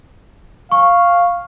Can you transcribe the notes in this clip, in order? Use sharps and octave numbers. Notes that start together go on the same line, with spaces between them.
F5 C#6